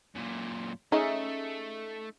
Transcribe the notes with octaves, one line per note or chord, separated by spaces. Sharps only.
F#2 A#2
A3 C#4 D#4 G#4 D#5 E5